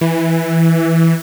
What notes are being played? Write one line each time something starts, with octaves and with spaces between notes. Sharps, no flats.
E3